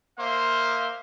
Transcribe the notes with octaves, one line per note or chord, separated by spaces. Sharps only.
A#3 C5 E5 F5 C6